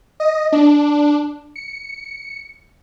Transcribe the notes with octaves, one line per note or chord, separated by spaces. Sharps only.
D#5
D4
C#7